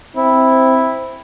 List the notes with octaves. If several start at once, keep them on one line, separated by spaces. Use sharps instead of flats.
C4 E4